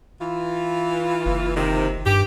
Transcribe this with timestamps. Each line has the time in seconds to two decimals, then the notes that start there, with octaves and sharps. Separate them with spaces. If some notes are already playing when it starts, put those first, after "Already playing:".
0.20 E3 F4
1.26 F#1
1.57 C3 D#3
2.06 G2 G4